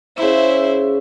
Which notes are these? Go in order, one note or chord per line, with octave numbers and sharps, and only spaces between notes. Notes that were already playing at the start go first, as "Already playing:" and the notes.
C#3 E4 C5 E5